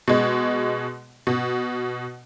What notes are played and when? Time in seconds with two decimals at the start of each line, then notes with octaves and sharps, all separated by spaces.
0.08 B2 G#3
1.27 B2